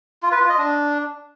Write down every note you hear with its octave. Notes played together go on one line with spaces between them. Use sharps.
F4
B4
F4
D#5
D4